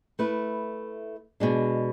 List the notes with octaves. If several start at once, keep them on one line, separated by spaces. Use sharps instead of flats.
A3 E4 B4
B2 G#3 D4